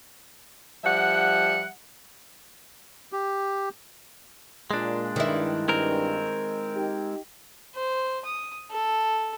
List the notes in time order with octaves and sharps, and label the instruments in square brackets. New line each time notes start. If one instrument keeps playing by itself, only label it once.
[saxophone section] F3 G3 E5 F#5
[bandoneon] G4
[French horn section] A#2 [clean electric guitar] G#3 D4
[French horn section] G2 [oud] D#3 E4
[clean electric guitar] G#3 C4 A#4
[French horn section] D#4 G4
[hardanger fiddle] C5
D#6
A4